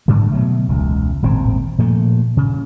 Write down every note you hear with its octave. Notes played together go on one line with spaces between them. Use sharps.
G#2 D3 G3
B2 F#3 A3
E1 C#2
D#1 G#1 A2 C4
A#2 F3 A3
C#3